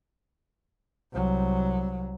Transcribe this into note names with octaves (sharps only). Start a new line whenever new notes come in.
C2 F#3